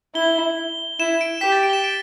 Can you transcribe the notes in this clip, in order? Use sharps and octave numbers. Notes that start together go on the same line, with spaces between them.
E4 G7
E4 E7
D7
G4 B6
A6
D7
G7
E7
D7